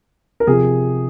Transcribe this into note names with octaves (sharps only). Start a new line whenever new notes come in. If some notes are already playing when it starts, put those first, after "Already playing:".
A#4
C3 F3 G#4